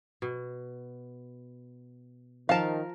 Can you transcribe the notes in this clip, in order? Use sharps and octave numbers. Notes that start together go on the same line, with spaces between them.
B2
D#3 F3 A#4 F5 A5